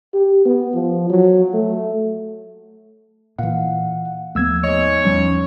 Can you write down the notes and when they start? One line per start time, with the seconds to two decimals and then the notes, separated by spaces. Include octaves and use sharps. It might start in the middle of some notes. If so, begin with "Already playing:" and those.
0.14 G4
0.46 B3
0.75 F3
1.10 F#3
1.54 A3
3.39 A#2 E3 F5 F#5
4.35 D#2 F3 A3 B3 E6 G#6
4.64 G#2 C#5 D#5
5.05 E2 F3 G3 C#4